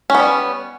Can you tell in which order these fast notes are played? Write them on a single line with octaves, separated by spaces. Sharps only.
C#4 B3 G3